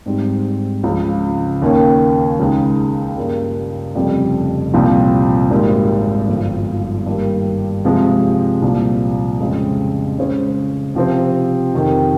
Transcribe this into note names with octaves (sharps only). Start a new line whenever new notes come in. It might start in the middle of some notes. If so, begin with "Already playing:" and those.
G#2 G3 C4 D#4
C#2 C#3 F3 G#3
D#2 D#3 A#3 C#4
C#2 C#3 G#3 D#4
G2 G3 A#3 C#4 G#4
F1 F2 C#3 G3
C2 A#2 F3 C4 F4
G#1 G#2 G3 A#3
G1 G2 F3
G2 D#3 G3 A#3
C3 F3 G#3
C2 A#2 F3
F2 C#3 G#3 C4
C#3 G#3 C#4 G#4 C5
C3 F3 C4 G4 C5
F2 C3 D#3